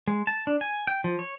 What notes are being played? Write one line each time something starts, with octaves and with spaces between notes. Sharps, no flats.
G#3
A5
D4
G#5
G5
F3
C#5